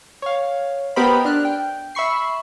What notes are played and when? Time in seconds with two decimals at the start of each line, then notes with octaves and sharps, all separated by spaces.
0.22 C#5 F5
0.96 B3 G4 A#4 C5 D#5 B5
1.25 D4 F6 F#6
1.45 G5
1.95 E5 B5 C#6 C7